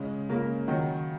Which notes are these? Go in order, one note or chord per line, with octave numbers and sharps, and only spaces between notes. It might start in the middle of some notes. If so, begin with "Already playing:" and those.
Already playing: C#3 G#3
C#3 A#3
D#3 F#3